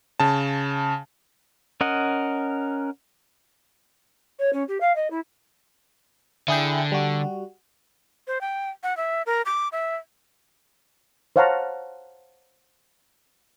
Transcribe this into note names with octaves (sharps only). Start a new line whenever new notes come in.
C#3 A5
C#4 A#4 D#5 F#5
C#5
C#4
G4
F5
D#5
E4
D3 E4 G#4 G5
G3 F#4
C5
G5
F#5
E5
A#4
D6
E5
C5 C#5 F5 F#5 A5 A#5